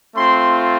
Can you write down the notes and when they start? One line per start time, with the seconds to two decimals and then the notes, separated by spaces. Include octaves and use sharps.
0.15 A3 C4 F4 C6